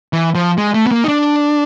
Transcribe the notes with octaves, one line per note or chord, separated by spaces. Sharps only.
E3
F3
G#3
A3
B3
A#3
D#4
D4